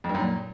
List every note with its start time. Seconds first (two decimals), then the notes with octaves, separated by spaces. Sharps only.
0.04 F2
0.09 G2
0.15 F#2
0.20 A#2